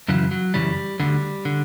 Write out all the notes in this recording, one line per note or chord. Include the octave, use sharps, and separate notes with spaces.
F#2 C#3 E3 F#3
F#3
F#2 C#3 E3 G3
D2 D3 G3
D3